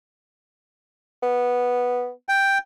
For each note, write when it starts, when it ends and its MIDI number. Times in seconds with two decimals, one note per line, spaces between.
1.23 2.10 59
2.29 2.58 79